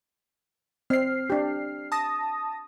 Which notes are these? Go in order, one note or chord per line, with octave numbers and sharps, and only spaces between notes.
C4 F6 C7
D4 G4
A5 D#6 A#6